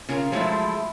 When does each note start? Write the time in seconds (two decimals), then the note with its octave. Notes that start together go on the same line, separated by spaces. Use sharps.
0.09 C#3 F4 A#4
0.32 F3 F#3 G#3 A3 E4